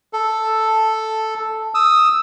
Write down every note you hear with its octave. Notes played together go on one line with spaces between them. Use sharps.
A4
D#6 E6